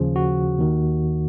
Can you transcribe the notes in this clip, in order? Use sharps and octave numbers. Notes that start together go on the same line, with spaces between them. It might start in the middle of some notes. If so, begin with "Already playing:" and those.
Already playing: D#2 C#3 F3
F#4
D#2 D#3